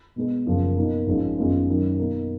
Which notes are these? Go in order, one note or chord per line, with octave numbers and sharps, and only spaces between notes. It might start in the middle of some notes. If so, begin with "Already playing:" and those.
B2 G#3 B3
F#1 F#2 F3 A#3
B2 A#3 D#4 A#4
G#1 G#2 F3 G#3 C#4
F#2 D#3 G#3 B3 F4
F#2 D#3 F#3
B2 A#3 D#4 A#4